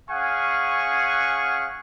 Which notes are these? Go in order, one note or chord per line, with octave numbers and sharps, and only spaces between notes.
C#4 G#4 F5 F#5 G#5 C#6